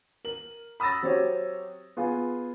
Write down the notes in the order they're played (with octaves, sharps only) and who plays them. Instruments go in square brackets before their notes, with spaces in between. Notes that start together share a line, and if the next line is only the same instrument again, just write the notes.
[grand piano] A#4 F#7
B5 D#6 E6 A6 A#6
F#3 C4 G4 C5 C#5
B3 F4 G#4